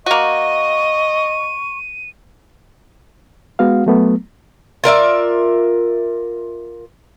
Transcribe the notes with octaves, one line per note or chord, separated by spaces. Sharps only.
A#3 F#4 D#5 C#6 D#7
G#3 B3 F#4 F5
F#3 A3 B3
F4 A#4 D5 E5